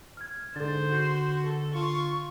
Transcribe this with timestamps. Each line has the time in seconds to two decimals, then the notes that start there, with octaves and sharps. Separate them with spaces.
0.17 F6 G#6
0.56 G#2 D3 A4 C5 A6
0.90 F#4 G6 C7
1.43 A4
1.75 F4 C#6 C#7